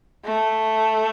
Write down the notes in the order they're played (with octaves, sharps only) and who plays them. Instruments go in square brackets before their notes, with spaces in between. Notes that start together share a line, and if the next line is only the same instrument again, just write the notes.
[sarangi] A3